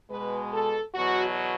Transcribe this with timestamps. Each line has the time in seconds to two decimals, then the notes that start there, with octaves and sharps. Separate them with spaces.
0.11 B2 G#3 B4
0.53 A4
0.94 E2 B2 F#3 F#4